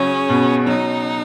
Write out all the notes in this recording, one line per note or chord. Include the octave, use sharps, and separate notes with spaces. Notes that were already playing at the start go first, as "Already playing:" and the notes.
Already playing: C#3 F#3 C#4
B2
F#3 D#4